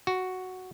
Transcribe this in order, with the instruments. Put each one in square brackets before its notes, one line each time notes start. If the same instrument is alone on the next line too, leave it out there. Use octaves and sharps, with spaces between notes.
[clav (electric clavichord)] F#4